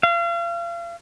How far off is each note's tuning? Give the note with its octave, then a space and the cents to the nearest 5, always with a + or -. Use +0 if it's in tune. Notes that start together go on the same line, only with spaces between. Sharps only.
F5 -35